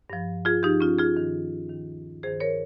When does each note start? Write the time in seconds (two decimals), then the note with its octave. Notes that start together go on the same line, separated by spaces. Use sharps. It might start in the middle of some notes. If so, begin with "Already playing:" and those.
0.10 G2 F3
0.45 F4 G#4
0.63 G2 F3 D#4 G4
0.81 C#4 F4
0.98 F4 G#4
1.17 G2 D#3
1.70 D#2 D#3
2.23 G2 D#3 G#4 C5
2.40 A#4 C#5